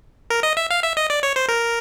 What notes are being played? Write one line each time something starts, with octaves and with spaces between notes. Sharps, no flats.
A#4
D#5
E5
F5
E5
D#5
D5
C#5
C5
A#4